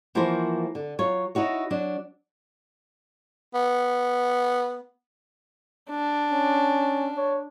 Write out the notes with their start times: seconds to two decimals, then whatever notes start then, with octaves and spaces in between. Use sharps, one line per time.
0.15 E3 F3 A#3 F#4 A#4 C5
0.75 D3
0.99 F#3 F4 C#5
1.35 D#4 E4 F#4 C#5
1.71 F#3 D4
3.54 B3
5.90 D4
6.32 C#4
7.17 C#5